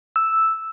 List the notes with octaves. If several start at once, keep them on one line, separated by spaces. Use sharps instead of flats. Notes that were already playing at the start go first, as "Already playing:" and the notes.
E6